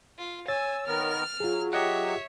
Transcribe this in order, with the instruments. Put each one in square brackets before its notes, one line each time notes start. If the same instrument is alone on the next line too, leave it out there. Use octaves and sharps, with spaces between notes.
[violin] F4
[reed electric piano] C#5 [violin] G#5 [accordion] E6 [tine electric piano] A6
[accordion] D#3 B3 A#4 [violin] F6
[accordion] F#3 [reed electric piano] F4 G#4
[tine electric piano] G4 D#5 F#5 [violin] C#5 E5